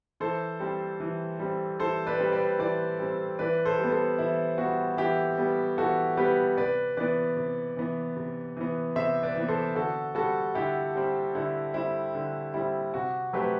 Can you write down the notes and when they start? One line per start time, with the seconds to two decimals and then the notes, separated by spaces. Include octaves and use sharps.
0.20 E3 A4 C5
0.60 G3 C4
1.00 E3
1.39 G3 C4
1.80 E3 A4 C5
2.07 B4 D5
2.20 G3 C4
2.32 B4 D5
2.59 E3 B4 D5
2.99 G3 C4
3.39 E3 B4 D5
3.65 A4 C5
3.78 G3
3.83 B3
3.92 A4 C5
4.18 E3 E4
4.58 G3 B3 F#4
4.97 E3 E4 G4
5.38 G3 B3
5.78 E3 F#4 A4
6.17 G3 B3 G4 B4
6.57 C3 B4 D5
6.97 E3 B3 B4 D5
7.37 C3
7.77 E3 B3
8.17 C3
8.57 E3 B3
8.96 C3 C5 E5
9.23 B4 D5
9.35 E3 B3
9.49 A4 C5
9.75 D3 F#4 A4
10.15 G3 C4 F#4 A4
10.55 D3 E4 G4
10.95 G3 C4
11.35 D3 E4
11.74 G3 C4 E4
12.15 D3
12.54 G3 C4 E4
12.94 C3 F#4
13.33 F#3 A3 C4 G4 B4